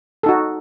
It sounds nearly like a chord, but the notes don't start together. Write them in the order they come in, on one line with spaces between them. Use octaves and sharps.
A4 D#4 F#4